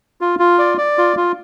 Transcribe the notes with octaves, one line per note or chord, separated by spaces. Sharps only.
F4
F4
D5
D5
F4
F4